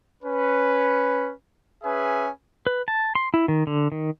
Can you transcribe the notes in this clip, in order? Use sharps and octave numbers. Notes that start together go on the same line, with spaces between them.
C#4 B4
C#4 G#4 B4 E5 G#5
B4
A5
C6
E4
D#3
D3
D#3